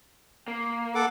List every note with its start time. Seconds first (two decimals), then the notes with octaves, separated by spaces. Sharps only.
0.48 A#3
0.95 A4 F#5 D6